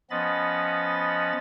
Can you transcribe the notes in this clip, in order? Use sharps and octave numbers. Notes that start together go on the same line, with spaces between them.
F3 B3 C#4 D#5 B5 A6